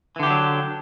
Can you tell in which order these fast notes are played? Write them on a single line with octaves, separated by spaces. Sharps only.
E3 D3 G4 D4 F#3